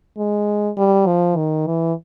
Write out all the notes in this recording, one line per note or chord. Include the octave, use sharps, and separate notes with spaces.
G#3
G3
F3
D#3
E3